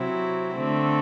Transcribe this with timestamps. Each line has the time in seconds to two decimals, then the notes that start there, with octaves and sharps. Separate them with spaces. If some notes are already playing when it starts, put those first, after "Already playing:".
Already playing: C3 F#3 C4 E4
0.56 D3 A3 C4